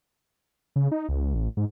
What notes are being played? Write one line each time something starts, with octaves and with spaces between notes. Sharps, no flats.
C#3
D#4
C#2
A1
G#2